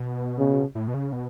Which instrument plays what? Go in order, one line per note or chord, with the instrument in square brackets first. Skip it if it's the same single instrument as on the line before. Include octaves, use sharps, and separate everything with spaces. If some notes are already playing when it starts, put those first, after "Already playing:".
Already playing: [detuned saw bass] B2
[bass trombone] C#3
[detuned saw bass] A2
B2
C#3
B2